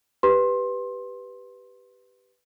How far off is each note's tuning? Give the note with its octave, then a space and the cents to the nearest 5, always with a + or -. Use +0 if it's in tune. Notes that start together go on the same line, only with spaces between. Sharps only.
G4 +0 B4 +0 C6 +20